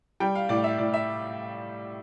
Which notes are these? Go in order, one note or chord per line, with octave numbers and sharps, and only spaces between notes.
G3 G5
F5
A2 D5
E5
A2 D5
E5